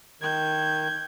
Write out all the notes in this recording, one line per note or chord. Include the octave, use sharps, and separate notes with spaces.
D#3 G6 G#6